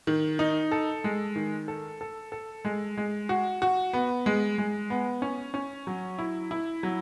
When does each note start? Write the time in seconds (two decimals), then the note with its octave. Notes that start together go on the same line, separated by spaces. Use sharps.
0.07 D#3
0.39 D#4
0.72 A4
1.04 G#3
1.36 D#3
1.68 A4
2.01 A4
2.32 A4
2.65 G#3
2.97 G#3
3.29 F#4
3.62 F#4
3.93 B3
4.26 G#3
4.58 G#3
4.90 B3
5.22 C#4
5.54 C#4
5.87 F#3
6.19 E4
6.51 E4
6.83 F#3